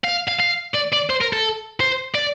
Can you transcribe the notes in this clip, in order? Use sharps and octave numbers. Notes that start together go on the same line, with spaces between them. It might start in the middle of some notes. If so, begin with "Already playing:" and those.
F5
F5
F5
D5
D5
C5
A#4
A4
C5
D5